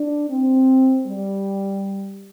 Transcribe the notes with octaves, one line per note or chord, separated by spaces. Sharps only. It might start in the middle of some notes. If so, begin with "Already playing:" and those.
Already playing: D4
C4
G3